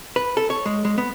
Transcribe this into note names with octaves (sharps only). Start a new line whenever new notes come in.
B4
A4
C#5
G#3
G#3
B3